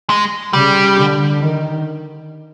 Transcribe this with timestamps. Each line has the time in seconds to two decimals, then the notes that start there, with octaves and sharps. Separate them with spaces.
0.10 G#3
0.53 C#3 G3
0.97 D3
1.40 D#3